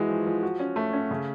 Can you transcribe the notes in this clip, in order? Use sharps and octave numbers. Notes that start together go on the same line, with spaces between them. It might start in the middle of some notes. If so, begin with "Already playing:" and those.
Already playing: E3 G#3 F#4
F3
F3
F#4
C#4
A3
C#4
C#3